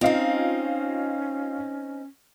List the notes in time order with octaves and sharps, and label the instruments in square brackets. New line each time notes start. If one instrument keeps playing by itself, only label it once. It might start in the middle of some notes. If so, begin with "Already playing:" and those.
[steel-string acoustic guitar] C4 D#4 [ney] C#4 [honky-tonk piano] F4 D#5 F5